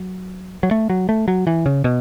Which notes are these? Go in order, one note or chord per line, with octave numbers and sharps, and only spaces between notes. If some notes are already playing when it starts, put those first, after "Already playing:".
Already playing: F#3
F#3
A3
F#3
A3
F#3
E3
C#3
B2